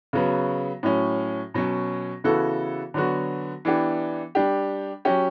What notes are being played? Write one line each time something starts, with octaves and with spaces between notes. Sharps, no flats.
C#3 F#3 B3
A2 F#3 C#4
B2 F#3 C#4
C#3 E3 B3 F#4 A4
D3 F#3 B3 F#4
E3 B3 D4 G4
G3 D4 G4
F#3 C#4 G4